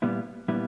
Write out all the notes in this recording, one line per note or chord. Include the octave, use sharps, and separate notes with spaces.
A#2 G3 B3 E4
A#2 G3 B3 E4